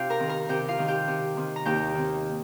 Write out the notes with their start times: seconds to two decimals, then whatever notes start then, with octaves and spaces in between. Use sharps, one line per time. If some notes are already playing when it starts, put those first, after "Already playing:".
Already playing: C3 D#4 F4 G4 F5 G5
0.10 A#4 A#5
0.20 D#3 C4
0.29 A#4 A#5
0.49 C3 G4 G5
0.68 F4 F5
0.78 D#3 C4
0.88 G4 G5
1.08 C3
1.37 D#3 C4
1.56 A#5
1.65 D#2 G4 G5
1.95 D#3 C4